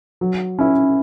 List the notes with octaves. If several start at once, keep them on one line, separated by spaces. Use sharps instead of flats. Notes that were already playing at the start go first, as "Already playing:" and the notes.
F#3
C#4 E4